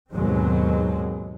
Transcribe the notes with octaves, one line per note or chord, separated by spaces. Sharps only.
D#2 G#2 B2 F#3 G#3 C4